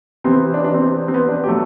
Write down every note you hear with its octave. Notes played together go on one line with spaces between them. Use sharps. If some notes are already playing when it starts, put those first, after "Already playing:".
C3 E3 B3 C4
D4
D4
C4
C4
B3
D4
B2 F#3 A3 G4